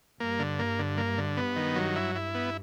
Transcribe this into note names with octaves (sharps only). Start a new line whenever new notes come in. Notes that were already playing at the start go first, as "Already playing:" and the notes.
G2 A#3
D3
A#3
D3
A#3
D3
B3
D#3
F#3
E4
E4
B3